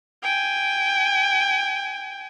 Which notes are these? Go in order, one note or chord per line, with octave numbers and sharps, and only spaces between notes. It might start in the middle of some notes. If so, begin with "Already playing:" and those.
G5 G#5